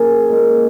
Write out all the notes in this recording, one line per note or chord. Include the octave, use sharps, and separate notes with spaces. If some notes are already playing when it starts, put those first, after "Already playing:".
Already playing: C#3 F#3 A#3 F#4 G#4 A#4
A#2 G#3